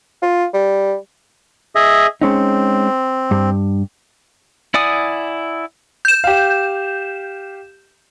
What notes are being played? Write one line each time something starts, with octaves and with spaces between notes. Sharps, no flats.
F4
G3
G#4 D#5 E5
G#3 C4 C#4 D#4
G2
E4 D5 F#5 G#5 D#6
G6 E7
G4 F5